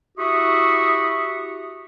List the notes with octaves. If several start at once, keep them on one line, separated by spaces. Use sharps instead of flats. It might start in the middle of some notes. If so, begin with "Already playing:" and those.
E4 F#4 G4 E5 C#6 D#6